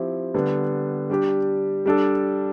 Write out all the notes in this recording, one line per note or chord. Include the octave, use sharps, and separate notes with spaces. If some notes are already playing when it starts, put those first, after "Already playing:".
Already playing: F3 C4 E4 G4
D3 G3 B3
G3 D4 G4
G3 D4 A4